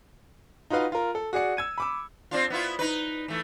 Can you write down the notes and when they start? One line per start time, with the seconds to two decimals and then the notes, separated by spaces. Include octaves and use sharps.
0.70 D#4 F4 F#4 B4 F5
0.92 F4 A#4
1.15 A4
1.33 F#4 G#4 D5 C#7
1.57 E6 G#6 D#7
1.78 B5 D6 E6
2.31 C4 D4 F4
2.50 B3 E4 F4
2.79 D#4 B4
3.28 E3 A3